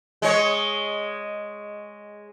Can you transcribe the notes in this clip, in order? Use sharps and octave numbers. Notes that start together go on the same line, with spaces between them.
G#3 C#5